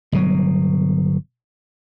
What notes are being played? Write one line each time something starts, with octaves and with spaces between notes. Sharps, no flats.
G1 B2 F#3